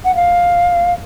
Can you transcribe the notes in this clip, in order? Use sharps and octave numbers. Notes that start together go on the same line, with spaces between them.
F#5
F5